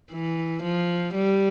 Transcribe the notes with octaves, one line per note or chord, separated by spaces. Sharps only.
E3
F3
G3